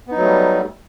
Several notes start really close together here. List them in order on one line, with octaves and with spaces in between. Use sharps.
B3 D#4 F#3 A3 G3